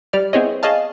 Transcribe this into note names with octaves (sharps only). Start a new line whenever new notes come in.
G3 D5 F6
B3 C4 E4 G#4 C#5 D#5
G#4 C#5 D#5 F5 A5